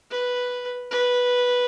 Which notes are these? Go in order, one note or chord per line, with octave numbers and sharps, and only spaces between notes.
B4
B4